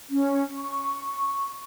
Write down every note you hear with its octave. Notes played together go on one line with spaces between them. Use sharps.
C#4
C#6